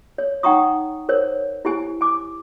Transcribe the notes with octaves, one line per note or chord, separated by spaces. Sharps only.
C#5
D#4 F#5 G5 A#5 C#6 D#6
A#4 C5 C#5
E4 G4 G#5
G#5 D6